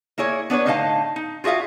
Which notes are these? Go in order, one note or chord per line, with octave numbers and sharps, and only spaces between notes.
A#3 E4 G#4 C#5
B3 D4 B4 C#5
A2 D3 D#4 D#5 F5 A5
D#4
F4 F#4 G#4 E5 F5